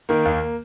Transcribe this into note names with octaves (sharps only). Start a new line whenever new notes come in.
D#3 A#3
D#2